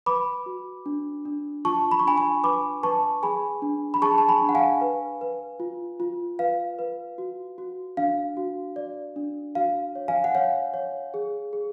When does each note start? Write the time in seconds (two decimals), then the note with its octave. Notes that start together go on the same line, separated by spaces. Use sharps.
0.06 B4 B5 D6
0.46 F#4
0.86 D4
1.25 D4
1.65 F4 A5 C#6
1.91 B5
1.99 C#6
2.04 D4 G#5 B5
2.17 G#5 B5
2.44 B4 B5 D6
2.83 B4 A5 C#6
3.23 G#4 G#5 B5
3.62 D4
3.94 B5
4.02 G#4 A5 C#6
4.18 A5
4.28 G#5 B5
4.41 D4
4.49 F#5
4.55 F5 G#5
4.81 B4
5.21 B4
5.60 F4
6.00 F4
6.39 B4 F5
6.79 B4
7.18 F#4
7.58 F#4
7.97 D4 F5
8.37 F#4
8.76 D5
9.16 D4
9.55 F#4 F5
9.95 C#5
10.08 F5 G#5
10.24 F#5
10.35 C#5 F5
10.74 C#5
11.14 G#4
11.53 G#4